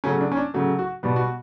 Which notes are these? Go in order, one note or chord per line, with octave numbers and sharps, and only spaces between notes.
C#3 F#3 A3 C#4
D4
C#4
D4
C#3 F#3 A3
F#4
B2 G3 B3
F#4